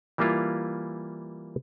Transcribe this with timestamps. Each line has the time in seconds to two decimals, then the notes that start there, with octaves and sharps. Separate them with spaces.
0.18 E3 G3 A#3 E4 F4